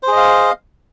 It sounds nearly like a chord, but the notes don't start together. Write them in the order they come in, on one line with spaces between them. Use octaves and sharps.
C5 G#4 D#5 F5